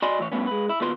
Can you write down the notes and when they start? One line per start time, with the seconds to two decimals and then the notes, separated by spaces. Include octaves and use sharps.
0.02 F#4 D5 D#5 G#5 B5 C6
0.19 A2 E3 C#5
0.32 G2 B2 A3 B3 C#4
0.47 G#3 B4
0.69 E4
0.81 D#2 B2 F4 B4 C6